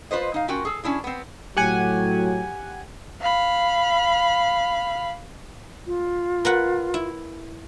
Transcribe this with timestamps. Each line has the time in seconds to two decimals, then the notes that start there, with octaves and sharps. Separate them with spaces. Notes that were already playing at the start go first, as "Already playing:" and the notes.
0.11 F4 B4 C5 D#5
0.34 D#4 F5
0.48 C#4 F4 F#4 A#4 G5
0.65 G#4 A4
0.84 C#4 D4 E4 G#4
1.04 B3 C4
1.57 A2 F#3 G4 F#5 G#5
3.21 F5 B5
5.87 F4
6.45 A#4 B4 F#5
6.94 E4